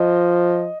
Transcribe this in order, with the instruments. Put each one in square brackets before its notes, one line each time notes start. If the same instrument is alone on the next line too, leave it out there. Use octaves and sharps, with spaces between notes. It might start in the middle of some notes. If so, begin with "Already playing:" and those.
Already playing: [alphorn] F3 [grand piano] D#5